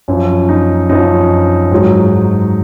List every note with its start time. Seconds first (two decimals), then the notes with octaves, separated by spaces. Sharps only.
0.08 F#2 F3
0.49 D#4
0.89 F#2 F3 D#4
1.72 G#2 F#3